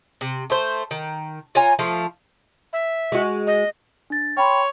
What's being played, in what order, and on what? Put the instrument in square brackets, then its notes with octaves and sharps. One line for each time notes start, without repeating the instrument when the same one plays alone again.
[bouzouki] C3
A3 C5
D#3
F4 C#5 G#5 A#5
F3 A3 F5
[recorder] E5
[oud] G#3 F#4
[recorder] D#5
[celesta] D4 A6
[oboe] C#5 [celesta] G5 B5 C6